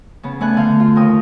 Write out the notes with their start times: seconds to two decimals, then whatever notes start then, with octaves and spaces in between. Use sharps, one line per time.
0.23 C#3 B3
0.41 A3 B3 D5 G#5 F#6
0.57 D3 F5 G6
0.80 F4
0.96 D#2 A#4 G5 D#6